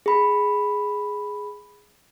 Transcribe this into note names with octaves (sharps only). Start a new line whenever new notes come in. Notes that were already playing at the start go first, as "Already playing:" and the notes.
G#4 B5